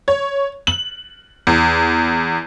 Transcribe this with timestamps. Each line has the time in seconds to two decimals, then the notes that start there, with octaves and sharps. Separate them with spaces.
0.08 C#5
0.67 F#7
1.47 E2